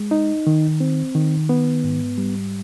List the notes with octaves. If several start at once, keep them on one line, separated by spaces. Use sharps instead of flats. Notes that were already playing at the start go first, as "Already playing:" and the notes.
Already playing: G#3
D#4
D#3
C4
D#3
B3
G#2
G3